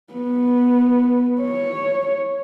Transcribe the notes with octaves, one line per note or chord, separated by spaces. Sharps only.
B3
C#5